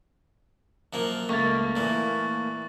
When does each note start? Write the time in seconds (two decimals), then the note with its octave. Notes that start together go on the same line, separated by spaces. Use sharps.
0.93 F#2 F3 A#3
1.29 C#2 A3 A#3 C#6 A6
1.76 A#2 E3